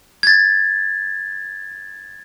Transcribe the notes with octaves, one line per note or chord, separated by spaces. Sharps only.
G#6 A6